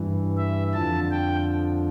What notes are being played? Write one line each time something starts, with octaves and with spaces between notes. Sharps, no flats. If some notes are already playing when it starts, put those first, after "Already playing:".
Already playing: G2 E3
E5
F2 D3 F3 A5
G5